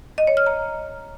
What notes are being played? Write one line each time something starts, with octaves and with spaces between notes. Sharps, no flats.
D#5
C#5
F6
A#5